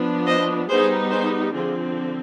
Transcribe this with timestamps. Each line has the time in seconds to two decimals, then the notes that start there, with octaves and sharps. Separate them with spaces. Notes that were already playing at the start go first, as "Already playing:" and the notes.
Already playing: F3 B3 D4
0.26 C5 D#5
0.69 G3 B3 D#4 G#4 C5
1.11 G#4 C5
1.53 D3 F3 C4 F4 G#4